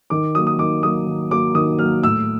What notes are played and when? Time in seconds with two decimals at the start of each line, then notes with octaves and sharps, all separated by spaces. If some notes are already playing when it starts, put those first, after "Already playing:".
0.10 D#3 D6
0.35 F#3 A#3 D#6
0.47 D#6
0.59 D#3 D6
0.83 F#3 A#3 D#6
1.07 D#3
1.31 F#3 A#3 D6
1.55 D#3 D#6
1.79 F#3 A#3 F6
2.03 A2 E6